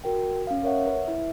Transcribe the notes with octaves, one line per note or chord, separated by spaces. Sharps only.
F#4 A#4 G5
C#4 F5
A#4 C#5 E5 F#5
B4
E4 E5